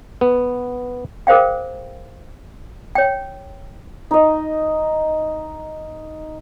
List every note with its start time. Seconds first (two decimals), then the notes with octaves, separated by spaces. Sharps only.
0.21 B3
1.27 G#4 A#4 C5 F5 G5
2.95 C#5 G5
4.11 D#4 D#5